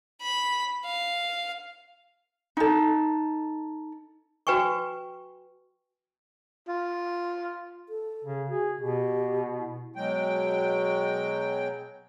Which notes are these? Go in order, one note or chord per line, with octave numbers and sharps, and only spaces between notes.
B5
F5
D#4 A4
F#4 B4 G5 G#5 C#6
F4
A4
C#3
F#4 G#4
B2 G4
E4
B2 F#3 G#3 G5